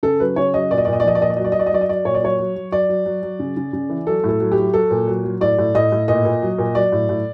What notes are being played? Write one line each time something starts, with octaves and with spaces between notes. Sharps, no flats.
C#3 A4
F#3 B4
C#3 C#5
F#3 D#5
A#2 D5
D#5
D5
A#2
D#5
D5
F3 D#5
D5
A#2 D#5
D5
F#3 D#5
D5
F#3 D#5
D5
D#5
F#3 D5
D#5
F#3 D5
A#2 C#5
D5
F#3 C#5
F#3
F#3
F#3 D5
F#3
F#3
F#3
C#3
C#3
C#3
E3
F#3 A4
A2 A4
F#3
G4
F#3
F#3 A4
A#2
F#3
F#3
A2 D5
A2
A2 D#5
A2
A#2 D#5
A#2
F#3
A#2
F#3 D5
A2
A2